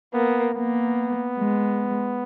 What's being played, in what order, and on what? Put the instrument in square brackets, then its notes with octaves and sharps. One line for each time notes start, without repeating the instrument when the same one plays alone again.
[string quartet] A#3 [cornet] B3
[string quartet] A#3 [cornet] B3
[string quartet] G#3